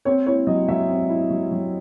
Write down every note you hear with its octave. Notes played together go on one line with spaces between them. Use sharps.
C4 C#5
E4 C#5
F#3 D#5
F#3 E5
C4
E4
F#3
F#3